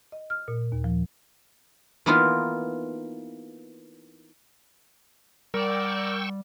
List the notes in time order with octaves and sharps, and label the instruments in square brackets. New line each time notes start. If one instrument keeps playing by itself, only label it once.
[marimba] D#5
F6
A#2
D#2
F3
[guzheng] E3 A#3 B3 D#4 F4
[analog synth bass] G3 [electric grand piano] A#4 [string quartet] D5 F#5 [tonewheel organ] G5 C#6 E6